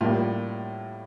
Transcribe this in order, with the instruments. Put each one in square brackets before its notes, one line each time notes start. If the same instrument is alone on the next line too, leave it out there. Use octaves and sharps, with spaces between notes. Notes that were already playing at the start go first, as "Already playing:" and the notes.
[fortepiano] A2 G3 A#3 F4